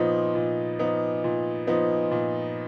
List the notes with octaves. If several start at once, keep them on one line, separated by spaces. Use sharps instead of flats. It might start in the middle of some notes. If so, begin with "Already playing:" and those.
Already playing: A#2 F3 B3 D#4
A#2
F3 B3 D#4
A#2
F3 B3 D#4
A#2